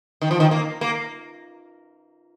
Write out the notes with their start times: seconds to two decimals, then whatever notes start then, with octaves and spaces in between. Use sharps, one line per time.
0.22 D#3
0.31 F3
0.40 D#3
0.51 A#3
0.81 A#3